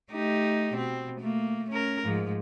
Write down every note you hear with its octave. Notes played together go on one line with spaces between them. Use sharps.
A3 D#4 G4
B2 C4
A3 A#3
C#4 A#4
G#2 F3